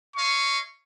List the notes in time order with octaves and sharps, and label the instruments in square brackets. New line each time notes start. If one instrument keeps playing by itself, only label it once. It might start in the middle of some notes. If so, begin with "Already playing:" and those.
[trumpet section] C#5 D#5 F5 [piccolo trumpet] C#6